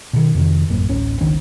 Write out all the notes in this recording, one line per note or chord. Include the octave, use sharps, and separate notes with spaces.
B2 D#3
F2 C3 D#3
E1 A1 F#2 A#3
D1 A1 C#4
G1 C#2 D#3 D4